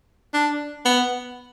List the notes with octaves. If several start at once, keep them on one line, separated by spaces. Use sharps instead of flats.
D4
B3